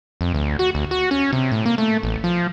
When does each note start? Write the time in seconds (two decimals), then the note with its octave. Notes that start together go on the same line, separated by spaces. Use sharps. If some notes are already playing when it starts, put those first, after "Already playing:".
0.21 F2
0.34 D2
0.59 F#4
0.75 D2
0.91 F#4
1.11 C#4
1.33 C3
1.52 A2
1.66 A#3
1.78 A3
2.03 A1
2.24 F3